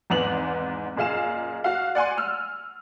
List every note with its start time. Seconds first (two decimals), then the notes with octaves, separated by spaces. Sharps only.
0.10 G#1 E2 G#2 B3 F7 F#7
0.96 F#1 A#2 G#4 F5 E7
1.64 F#4 F5
1.95 D5 F#5 G#5 C6
2.17 E6 F6